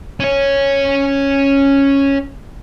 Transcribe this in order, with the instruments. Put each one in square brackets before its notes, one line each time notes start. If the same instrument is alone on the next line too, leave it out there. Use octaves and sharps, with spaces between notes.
[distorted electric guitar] C#4 C#5